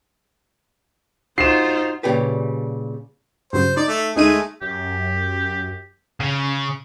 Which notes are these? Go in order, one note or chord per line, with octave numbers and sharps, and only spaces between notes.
D#4 F4 F#4 C5 C7 E7
A#2 C#3 G3 G4 B4
G2 C#3 F#3 C5
D#4 D5
A3
D2 G#3 A3 D#4 G#4 D#7
F#2 G4
C#3